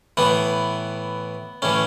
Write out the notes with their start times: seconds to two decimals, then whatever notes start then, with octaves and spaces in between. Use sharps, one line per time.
0.17 A2 E3 B3
1.62 A2 E3 C#4